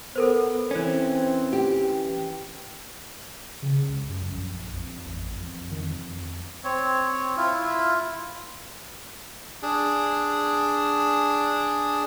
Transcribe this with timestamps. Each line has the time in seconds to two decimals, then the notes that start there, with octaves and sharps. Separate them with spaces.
0.15 B3 A4 A#4 C5
0.71 E3 C4 C#4
1.53 G4
3.62 C#3
3.89 C#2
4.09 F#2
4.31 A#1
4.73 F2
5.05 A1
5.36 F2
5.71 D#3
5.83 F2
6.64 C4 C#5
7.37 E4 F4
9.62 D4 G#4